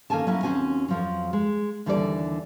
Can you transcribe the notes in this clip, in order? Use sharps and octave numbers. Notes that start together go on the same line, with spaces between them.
D#3 A#3 C#4 A4 G#5 A5
F#3 A#3 C#4 E4
D#2 C4 C#4 F#4 G#5
F2 F3 F#3
G#3
D#2 D3 E3 G3 D4 D5